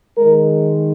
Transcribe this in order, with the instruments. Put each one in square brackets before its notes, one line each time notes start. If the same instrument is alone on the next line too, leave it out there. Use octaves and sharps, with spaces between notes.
[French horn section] D#3 G#3 A#4